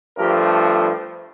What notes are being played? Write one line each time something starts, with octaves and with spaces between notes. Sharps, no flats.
G2 F3 A3 G4 A#4